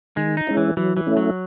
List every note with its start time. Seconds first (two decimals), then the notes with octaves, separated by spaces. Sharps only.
0.17 D#3 G#3
0.37 D#4
0.47 G#3 C#4 E4
0.57 E3
0.77 E3 F#3
0.97 E3
1.07 A3 C#4 E4
1.17 F#3